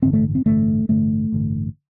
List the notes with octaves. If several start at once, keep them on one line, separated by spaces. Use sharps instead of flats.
A1 G2 D3 C4
A3
C4
A1 G2 D3 A3
A1 G2 D3 A3
A1 G2 D3